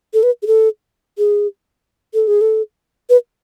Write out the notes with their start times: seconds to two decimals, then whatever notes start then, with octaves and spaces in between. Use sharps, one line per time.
0.14 A4
0.23 B4
0.43 G#4
0.47 A4
1.18 G#4
2.14 A4
2.28 G#4
2.41 A4
3.10 B4